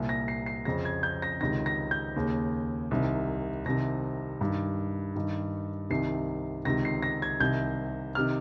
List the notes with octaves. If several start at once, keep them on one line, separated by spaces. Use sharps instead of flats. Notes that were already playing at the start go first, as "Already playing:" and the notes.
Already playing: C2 A#2
A#6
C7
C7
F2 C#3 A#6
G#6
G6
A#6
C#2 C3 D#3 A#6
A#6
G6
D#2 C#3
C2 C3 D#3
C2 C3 D#3 A#6
G2 D#3
G2 D#3
C2 C3 D#3 C7
C#2 C3 D#3 A#6
C7
A#6
G#6
C2 C3 D#3 G6
C3 D#3 F6